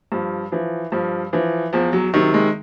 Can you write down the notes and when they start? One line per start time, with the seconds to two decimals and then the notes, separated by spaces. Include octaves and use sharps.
0.12 G2 F3
0.52 E3 F3
0.92 G2 F3
1.33 E3 F3
1.73 E2 F3
1.93 F#3
2.14 C3 D#3 F#3
2.34 G#3